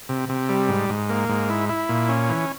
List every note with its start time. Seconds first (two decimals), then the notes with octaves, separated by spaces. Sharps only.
0.09 C3
0.29 C3
0.49 G3
0.69 G#2
0.89 G#2
1.09 A#3
1.29 G#2
1.49 E4
1.69 E4
1.89 A#2
2.09 C#4
2.29 E3